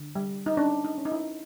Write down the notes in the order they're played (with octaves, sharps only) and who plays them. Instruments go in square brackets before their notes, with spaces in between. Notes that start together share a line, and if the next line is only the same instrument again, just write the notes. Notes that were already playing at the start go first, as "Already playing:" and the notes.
Already playing: [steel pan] D3
G3
D#4
C#4 D4
D#4
C#4
D#4
E4